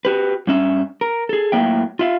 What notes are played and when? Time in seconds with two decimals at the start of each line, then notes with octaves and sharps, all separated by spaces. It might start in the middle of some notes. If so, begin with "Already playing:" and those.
0.05 F#4 G4 B4
0.47 G2 C#4 E5
1.01 A#4
1.29 G#4 A4
1.52 A2 F#3 A#3 E5 G5
1.99 F4 E5 F5